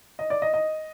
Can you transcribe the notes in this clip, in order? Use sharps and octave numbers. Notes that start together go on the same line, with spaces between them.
D#5
D5
D#5
D#5